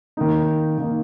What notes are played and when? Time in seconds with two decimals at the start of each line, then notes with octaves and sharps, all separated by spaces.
0.17 D#3 A#3 D#4
0.78 D#3 A#3 D#4